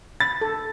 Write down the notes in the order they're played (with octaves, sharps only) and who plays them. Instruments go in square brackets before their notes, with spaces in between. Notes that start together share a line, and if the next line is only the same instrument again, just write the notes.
[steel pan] B5 [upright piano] A6
[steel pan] A4